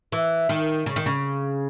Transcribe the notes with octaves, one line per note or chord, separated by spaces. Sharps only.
E3
D#3
C#3
D#3
C#3